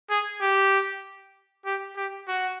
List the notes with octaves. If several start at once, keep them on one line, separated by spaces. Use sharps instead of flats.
G#4
G4
G4
G4
F#4